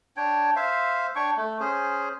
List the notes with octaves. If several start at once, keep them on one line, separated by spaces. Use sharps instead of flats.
D4 C#5 G5
C5 E5 F5
D4 C#5 G5 C#6
A3
C#4 G#4 C5